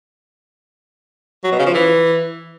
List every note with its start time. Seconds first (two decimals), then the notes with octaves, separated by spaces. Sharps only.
1.44 F#3
1.51 B2
1.59 C#3
1.66 F3
1.74 E3